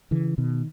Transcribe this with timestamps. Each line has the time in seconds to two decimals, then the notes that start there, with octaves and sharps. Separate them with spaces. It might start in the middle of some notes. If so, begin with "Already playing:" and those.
0.11 C#3 E3
0.38 B2 D#3